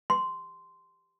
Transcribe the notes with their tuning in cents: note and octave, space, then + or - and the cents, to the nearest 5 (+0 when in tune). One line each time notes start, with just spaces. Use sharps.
C6 -10